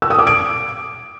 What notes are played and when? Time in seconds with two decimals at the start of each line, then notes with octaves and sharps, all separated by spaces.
0.02 E6
0.10 D#6
0.19 D6
0.27 D7